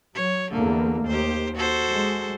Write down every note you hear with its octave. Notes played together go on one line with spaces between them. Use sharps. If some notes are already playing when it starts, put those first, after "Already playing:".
F#3 C#5
E2 D3 A3 A#3
D#2 G4 C5
F#4 A4 C5
G#3